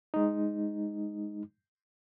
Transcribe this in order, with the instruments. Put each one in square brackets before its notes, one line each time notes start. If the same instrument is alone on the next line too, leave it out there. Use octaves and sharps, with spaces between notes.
[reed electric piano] G#3 D#4